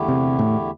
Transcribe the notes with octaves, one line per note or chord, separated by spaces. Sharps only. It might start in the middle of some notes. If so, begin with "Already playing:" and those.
Already playing: E2 D3 A3 E4 G4
C3
A2